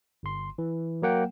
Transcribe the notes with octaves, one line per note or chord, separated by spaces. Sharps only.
G1 C6
E3
F#3 A#3 F#5 G5